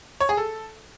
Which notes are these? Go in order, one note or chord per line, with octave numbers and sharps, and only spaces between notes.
C#5
G#4
A4